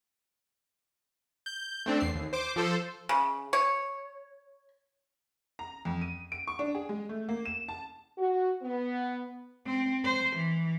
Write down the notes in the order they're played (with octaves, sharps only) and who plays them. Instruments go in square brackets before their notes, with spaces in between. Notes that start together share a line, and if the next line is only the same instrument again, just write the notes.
[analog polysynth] G6
A3 C4 D4
E2 C7
D#2
C5 D6
F3 A4 C5
[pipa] C#3
C#5
[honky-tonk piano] A#5
F2
D#7
D7
C#6
D4
G#4
G#3
A3
A#3
E7
A5
[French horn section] F#4
B3
[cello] C4
C5
E3